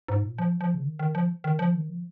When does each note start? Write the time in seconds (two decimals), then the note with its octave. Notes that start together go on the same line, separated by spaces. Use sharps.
0.08 G#2
0.23 A#2
0.38 F3
0.61 F3
0.74 C#3
0.84 D#3
0.99 D#3
1.15 F3
1.44 D#3
1.59 F3
1.75 D#3
1.89 F3